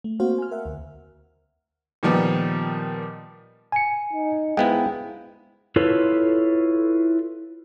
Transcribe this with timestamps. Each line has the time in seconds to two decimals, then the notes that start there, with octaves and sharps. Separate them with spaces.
0.04 A3
0.20 A#3 C4 F#4 C5 F5
0.38 G#5 F6
0.51 A#4 E5 F#5
0.66 D2
2.03 A#2 D#3 F3 G3 B3
3.72 G#5 C#7
4.13 D#4
4.57 G#2 G#3 B3 E4 F5 G5
5.76 E4 F4 A4 B4 C#5